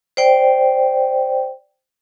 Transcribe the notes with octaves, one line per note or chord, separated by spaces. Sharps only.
C5 D5 G5